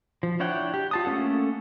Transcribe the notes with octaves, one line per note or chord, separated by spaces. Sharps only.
F3
D4 E4 C#5 F#5 G5
G4
F4 A5 D#6
A3 A#3 C#4 A4 F#5